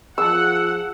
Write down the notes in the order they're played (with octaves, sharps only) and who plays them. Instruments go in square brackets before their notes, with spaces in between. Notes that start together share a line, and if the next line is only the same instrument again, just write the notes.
[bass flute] F3 [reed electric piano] G#4 A5 [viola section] F#5 [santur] E6